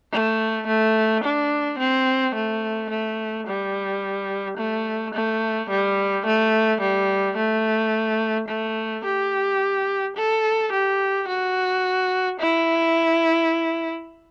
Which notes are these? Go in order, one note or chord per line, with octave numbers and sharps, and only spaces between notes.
A3
A3
D4
C4
A3
A3
G3
A3
A3
G3
A3
G3
A3
A3
G4
A4
G4
F#4
E4